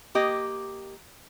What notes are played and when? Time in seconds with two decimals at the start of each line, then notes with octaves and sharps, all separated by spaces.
0.15 A#3 G4 D#5